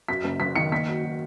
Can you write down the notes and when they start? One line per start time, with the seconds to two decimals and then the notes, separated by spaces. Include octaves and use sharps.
0.08 F#2 B6
0.24 F#1
0.40 F#1 B6
0.56 D#3 C#7
0.71 A#3 B6
0.88 F#3
1.04 F#3